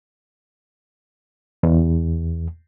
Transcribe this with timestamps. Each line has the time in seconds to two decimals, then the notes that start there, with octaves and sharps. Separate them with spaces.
1.63 E2